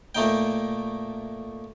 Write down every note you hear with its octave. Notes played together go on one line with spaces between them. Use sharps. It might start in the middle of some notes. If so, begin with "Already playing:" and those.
A#2 A3 D#4 G5